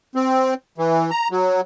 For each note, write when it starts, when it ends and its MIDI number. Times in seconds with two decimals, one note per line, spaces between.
0.15 0.54 60
0.78 1.11 52
1.11 1.28 82
1.31 1.61 54